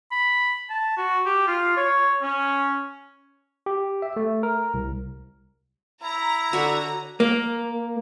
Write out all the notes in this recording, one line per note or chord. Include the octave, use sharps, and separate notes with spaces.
B5
A5
F#4
G4
F4
C#5
C#4
G4
E5
A3
A#4
C2
E4 A#5
D3 F#4 C#5 F#5
A#3